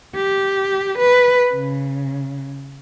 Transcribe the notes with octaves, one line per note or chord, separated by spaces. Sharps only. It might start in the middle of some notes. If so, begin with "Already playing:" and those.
G4
B4
C#3